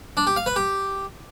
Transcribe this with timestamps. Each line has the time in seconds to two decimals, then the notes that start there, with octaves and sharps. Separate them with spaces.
0.17 D4
0.27 G4
0.36 F5
0.46 B4
0.56 G4